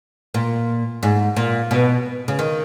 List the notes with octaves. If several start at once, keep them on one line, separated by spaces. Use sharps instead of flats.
A#2
G#2
A#2
B2
C#3
D#3